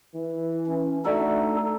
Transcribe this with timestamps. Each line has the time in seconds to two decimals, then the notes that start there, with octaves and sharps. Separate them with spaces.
0.15 E3
0.66 C#4
1.05 A3 D4 D#4 F#4 A4 D5 E5